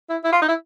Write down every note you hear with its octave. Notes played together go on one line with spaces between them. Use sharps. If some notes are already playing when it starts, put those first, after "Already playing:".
E4
E4
F4
D#4
E4